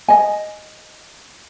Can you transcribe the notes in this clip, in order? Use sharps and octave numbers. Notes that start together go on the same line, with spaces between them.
D#5 G#5